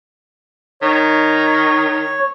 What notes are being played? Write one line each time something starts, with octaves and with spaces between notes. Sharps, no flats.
D#3 C#5